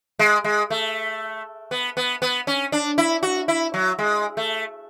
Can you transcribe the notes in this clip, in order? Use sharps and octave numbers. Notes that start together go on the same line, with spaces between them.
G#3
G#3
A3
B3
B3
B3
C#4
D4
E4
F#4
E4
F#3
G#3
A3